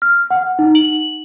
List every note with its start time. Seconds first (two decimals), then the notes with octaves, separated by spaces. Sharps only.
0.02 F6
0.30 F#5
0.59 D#4
0.75 F#7